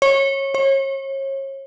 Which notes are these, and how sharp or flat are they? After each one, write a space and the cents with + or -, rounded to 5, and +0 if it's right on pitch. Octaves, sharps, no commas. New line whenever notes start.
C#5 -20
C#5 -35